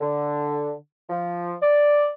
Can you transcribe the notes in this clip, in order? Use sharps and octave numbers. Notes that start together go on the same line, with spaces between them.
D3
F3
D5